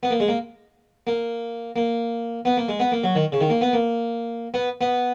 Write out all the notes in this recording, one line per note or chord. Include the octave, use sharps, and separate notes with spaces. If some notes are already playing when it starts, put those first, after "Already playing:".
B3
A#3
G#3
A#3
A#3
A#3
B3
A#3
G#3
B3
A#3
F#3
D#3
C#3
D#3
A#3
B3
A#3
B3
B3